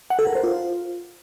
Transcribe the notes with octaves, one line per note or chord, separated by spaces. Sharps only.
F#5
A4
A#4
C5
F4